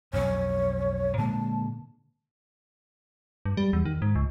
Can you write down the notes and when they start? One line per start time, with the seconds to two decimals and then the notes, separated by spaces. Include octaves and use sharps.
0.13 B1 F2 C#5
1.18 A#2 D3 G#3 A5
3.45 G2
3.57 G3
3.73 E2
3.85 D#3
4.02 G#2
4.15 C#2